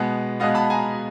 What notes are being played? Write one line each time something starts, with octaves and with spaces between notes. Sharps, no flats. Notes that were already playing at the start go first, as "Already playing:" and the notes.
Already playing: B2 G#3 B3
B2 G#3 B3 D#5 F5
A5 B5
G#5 A#5